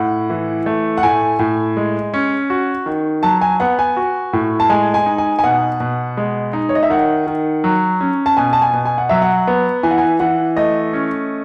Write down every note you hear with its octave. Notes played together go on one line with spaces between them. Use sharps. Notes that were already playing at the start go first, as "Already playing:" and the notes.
Already playing: A2 F#5
E3
A3
F#5
A2 G#5
A2
G#3
C#4
F#4
D#3
F#3 A5
G#5
B3 F#5
G#5
F#4
A2
A5
G#3 G#5
G#5
D#4
G#5
G#5
B2 F#5
B2
G#3
D#4
C#5
D#5
E5
D#3 F#5
D#3
F#3
C#4
A5
B2 G#5
A5
G#5
B2
G#5
F#5
F#3 E5
F#5
B3
E3 G#5
F#5
G#5
E3 F#5
A3 D#5
C#4